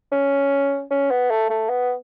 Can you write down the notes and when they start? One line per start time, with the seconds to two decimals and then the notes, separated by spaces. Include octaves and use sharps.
0.12 C#4
0.91 C#4
1.11 B3
1.31 A3
1.50 A3
1.70 B3